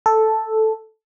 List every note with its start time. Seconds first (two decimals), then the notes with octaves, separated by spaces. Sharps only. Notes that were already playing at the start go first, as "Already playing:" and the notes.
0.06 A4